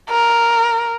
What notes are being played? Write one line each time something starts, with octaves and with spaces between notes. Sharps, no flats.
A#4